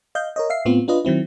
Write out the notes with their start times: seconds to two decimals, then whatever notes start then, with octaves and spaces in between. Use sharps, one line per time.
0.15 D#5 F5 G6
0.36 A#4 C#5 D#5
0.50 E5 F5 C7
0.65 A2 B3 C4 F4
0.88 D4 F4 B4 D#5
1.05 D#3 F#3 C4 E4